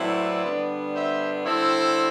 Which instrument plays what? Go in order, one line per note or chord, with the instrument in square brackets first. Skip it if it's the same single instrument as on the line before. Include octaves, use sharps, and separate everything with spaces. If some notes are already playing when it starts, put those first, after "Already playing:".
Already playing: [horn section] A2 F#3 C4 E4 B4 D5
D3 G3 B3 D4
C5 E5
D3 G3 C4 E4 A4 C5